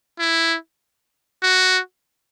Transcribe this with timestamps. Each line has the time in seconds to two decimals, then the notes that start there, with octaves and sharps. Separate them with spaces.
0.19 E4
1.43 F#4